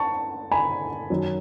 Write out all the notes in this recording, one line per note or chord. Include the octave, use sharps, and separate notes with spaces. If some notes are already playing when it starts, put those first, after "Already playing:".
Already playing: A5 C#6
G#5 B5
F#2 D#3 F#3